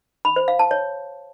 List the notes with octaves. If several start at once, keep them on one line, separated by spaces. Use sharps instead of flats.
B5
C5
F5
A5
C#5